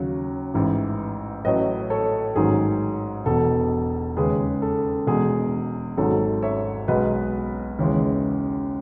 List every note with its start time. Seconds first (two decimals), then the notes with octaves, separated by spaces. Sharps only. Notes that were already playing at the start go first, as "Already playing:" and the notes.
Already playing: D#2 C#3 F#3
0.54 A1 G#2 E3
1.44 A1 A2 F#3 B4 D#5
1.90 A4 C#5
2.35 A1 G#2 D#3 F#3 G#4
3.26 E1 E2 B2 A4
4.16 D#2 C#3 G#3 G#4 B4
4.62 A4
5.07 E1 E2 B2 G#3 G#4
5.97 G#1 G#2 F#3 A4
6.43 C#5 E5
6.88 B1 B2 G#3 B4 D#5
7.79 D#2 C#3 E3 G#3